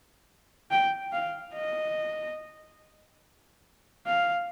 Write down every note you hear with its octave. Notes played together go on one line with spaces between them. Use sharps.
G5
F5
D#5
F5